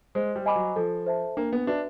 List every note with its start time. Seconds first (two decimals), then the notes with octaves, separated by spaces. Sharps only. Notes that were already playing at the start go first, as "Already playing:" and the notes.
0.15 G#3 C5
0.36 G3
0.46 D#5 G#5 B5 D6
0.56 F#3
0.76 F3 A4
1.06 C5 E5 A5
1.37 A#3 D4
1.53 B3
1.67 D4 F#4 B4 E5